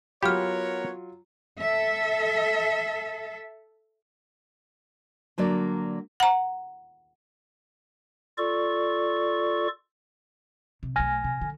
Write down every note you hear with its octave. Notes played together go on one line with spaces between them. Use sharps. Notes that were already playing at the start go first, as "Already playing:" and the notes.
F#3 B3 F4 G4 A#4 C#5 B5 F6
A4 E5
D3 F#3 A#3 D5
F#5 A#5
F4 A4 D5 C#6
C3
B1 A3 G#5 F6 A#6
C3
D3